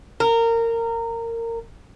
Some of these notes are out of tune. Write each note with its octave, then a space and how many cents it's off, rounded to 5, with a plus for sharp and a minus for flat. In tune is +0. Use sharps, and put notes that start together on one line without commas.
A#4 -20